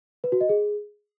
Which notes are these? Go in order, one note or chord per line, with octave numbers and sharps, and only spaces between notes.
B4
F#4
D#5
G#4